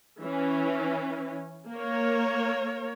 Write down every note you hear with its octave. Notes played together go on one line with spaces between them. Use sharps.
E3 C#4
A#3 A#4 C#5